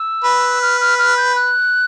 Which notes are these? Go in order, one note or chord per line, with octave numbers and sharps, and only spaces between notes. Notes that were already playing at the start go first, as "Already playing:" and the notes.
Already playing: E6
B4
F6
F6
F6
G6
F#6